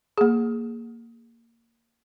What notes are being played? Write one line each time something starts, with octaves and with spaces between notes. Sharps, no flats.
A#3 G#4